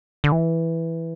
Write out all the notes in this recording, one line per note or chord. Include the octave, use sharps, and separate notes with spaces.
D3
E3